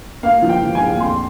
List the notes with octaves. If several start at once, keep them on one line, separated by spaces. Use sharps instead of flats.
A#3 F5
F3
G5
F3
G#5
A#1
F2 C6